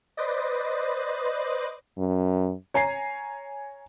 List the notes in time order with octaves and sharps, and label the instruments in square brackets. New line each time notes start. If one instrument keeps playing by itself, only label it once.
[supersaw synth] B4 C5 D5 D#5
[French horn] F#2
[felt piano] C#5 G#5 A#5 C7